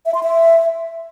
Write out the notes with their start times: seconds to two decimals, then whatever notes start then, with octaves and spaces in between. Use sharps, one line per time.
0.06 E5
0.14 C6
0.23 E5